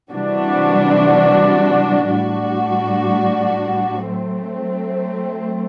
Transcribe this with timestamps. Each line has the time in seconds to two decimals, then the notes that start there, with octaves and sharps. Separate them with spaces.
0.11 C3 E3 G3 D4 F#4
2.09 A2 G3 D4 F#4
4.08 F#3 A3 C4